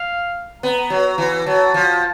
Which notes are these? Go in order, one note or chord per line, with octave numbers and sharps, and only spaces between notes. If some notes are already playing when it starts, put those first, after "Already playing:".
Already playing: F5
B3 A#5
F#3
E3
F#3 A5
F3